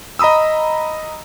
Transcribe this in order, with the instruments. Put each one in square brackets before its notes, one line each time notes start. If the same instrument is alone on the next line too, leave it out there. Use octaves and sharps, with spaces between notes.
[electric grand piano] D#5 A#5 B5 D#6 E6